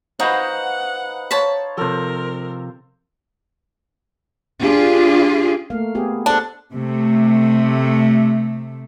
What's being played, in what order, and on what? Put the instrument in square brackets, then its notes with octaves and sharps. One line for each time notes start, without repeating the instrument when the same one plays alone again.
[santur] D#4 B4 [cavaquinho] F#4 [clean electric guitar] C5 D#5 F5 [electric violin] F#5
[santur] C5 C#5 F5 [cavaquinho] A5 B5
[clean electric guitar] C3 F3 [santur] A4 C5 [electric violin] A#4
[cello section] D4 F4 G4 G#4
[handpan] A3 A#3 F5
B3 G4 G#4
[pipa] D4 [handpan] A4 C5 F#5
[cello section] C3 A3